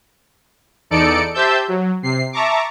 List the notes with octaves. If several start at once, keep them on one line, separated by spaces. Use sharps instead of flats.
E2 D#4 A4 D5 C#7 D7
G4 C5 E5 A5 E6 G6
F#3
C3 C7
E5 A5 A#5 C#6 D6